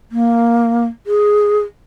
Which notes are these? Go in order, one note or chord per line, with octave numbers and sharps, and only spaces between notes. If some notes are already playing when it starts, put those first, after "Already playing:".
A#3
G#4